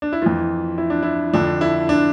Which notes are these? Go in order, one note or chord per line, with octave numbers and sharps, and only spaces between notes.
D4
E4
F2 E3 F4
E4
D4
E4
F2 D3 F3 D4
E4
D4